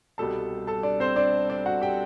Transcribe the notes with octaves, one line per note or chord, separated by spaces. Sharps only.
C2 B2 G3 A4 A5
A4 A5
D4 D5
C4 C5
D4 D5
D4 D5
F#4 F#5
G4 G5